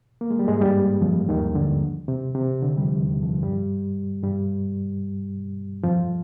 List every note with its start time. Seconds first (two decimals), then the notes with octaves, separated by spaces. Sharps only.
0.21 A#3
0.31 G#3
0.39 G3
0.48 G#2 G#3
0.61 G2 G3
1.01 F2 F3
1.28 D#2 D#3
1.55 D3
2.08 C3
2.35 C3
2.62 D3
2.78 G3
2.82 F2 F3
3.02 D#2 D#3
3.22 F2 F3
3.42 G2 G3
4.22 G2 G3
5.83 F2 F3